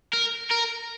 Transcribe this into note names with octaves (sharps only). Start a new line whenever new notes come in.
A#4
A#4